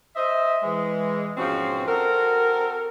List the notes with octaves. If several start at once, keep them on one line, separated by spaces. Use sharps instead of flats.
C5 D#5 E5
E3 G#3
G#2 B2 F3 C4 C#4 F#4
C4 F#4 A4 A#4